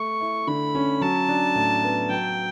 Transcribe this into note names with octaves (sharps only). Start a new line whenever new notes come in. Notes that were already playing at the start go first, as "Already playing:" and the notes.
Already playing: A3 C#6
E4
D3 B5
C#4
F#3 A5
D4
A2
B3
F#3 G5